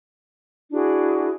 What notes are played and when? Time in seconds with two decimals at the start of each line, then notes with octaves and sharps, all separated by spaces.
0.72 D4 E4 F#4 G#4